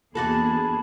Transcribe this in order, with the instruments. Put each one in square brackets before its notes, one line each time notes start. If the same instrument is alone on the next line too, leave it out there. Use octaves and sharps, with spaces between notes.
[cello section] E2 A#3 G#4 [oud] D4 F#4 A4 [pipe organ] A5 B5